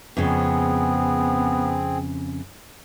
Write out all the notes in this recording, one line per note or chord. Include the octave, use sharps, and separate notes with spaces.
F2 C#3 B3 C4 G#4